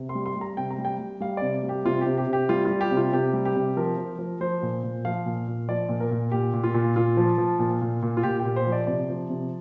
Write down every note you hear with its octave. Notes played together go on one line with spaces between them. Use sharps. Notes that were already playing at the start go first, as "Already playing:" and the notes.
Already playing: C3
C6
G3
C6
G3
A#5
C3 G5
A#5
G3
G5
G3
G3 F5
C3 D5
G3
G4
C3 F4
G4
C3
G4
C3
G4
G3 F4
F4
G3
G4
C3
F4
C3 G4
G3
G4
C3
F3 A#4
F3
F3
F3 C5
A#2
A#2
F3 F5
A#2
A#2
F3 D5
A#2
A#4
A#2
A#2 G4
A#2
F4
A#2
A#2 F4
F3
F3
A#2
A#2
A#2
F4
A#2 G4
G4
A#2
C5
F3
D5
C3 D5
F3
C3